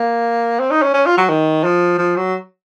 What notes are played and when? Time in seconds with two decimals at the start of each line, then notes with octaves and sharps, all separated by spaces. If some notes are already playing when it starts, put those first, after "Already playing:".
Already playing: A#3
0.60 C4
0.71 D#4
0.82 C#4
0.93 C#4
1.06 F4
1.17 F#3
1.29 D#3
1.64 F3
1.98 F3
2.16 F#3